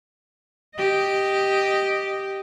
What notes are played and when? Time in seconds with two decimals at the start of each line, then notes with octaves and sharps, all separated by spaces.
0.76 G4 D#5